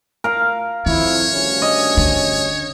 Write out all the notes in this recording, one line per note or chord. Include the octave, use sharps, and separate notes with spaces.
A#4 F5
F2 D#3 E4 C#5
D2 G2 C#4
D#5
D3